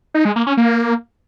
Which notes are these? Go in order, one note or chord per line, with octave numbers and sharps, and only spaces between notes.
D#4
G#3
A#3
C#4
A#3